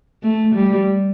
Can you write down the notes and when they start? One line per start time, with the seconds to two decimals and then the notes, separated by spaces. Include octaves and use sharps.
0.23 A3
0.55 G3